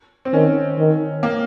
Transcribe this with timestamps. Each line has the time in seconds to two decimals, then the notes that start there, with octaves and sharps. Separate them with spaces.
0.25 C4
0.33 D#3 C#4
0.78 D#3
1.23 A#3